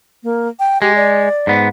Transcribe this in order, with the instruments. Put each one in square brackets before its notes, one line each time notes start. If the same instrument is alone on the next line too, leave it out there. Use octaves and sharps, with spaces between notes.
[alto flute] A#3
G5
[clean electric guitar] G#3 [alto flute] G4
[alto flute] D5
[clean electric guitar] G#2 B3